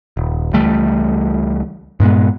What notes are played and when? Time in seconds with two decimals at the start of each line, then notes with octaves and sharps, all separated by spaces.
0.17 D#1
0.53 C#2 E3 G3 A3
2.00 G2 A#2 G#3 B3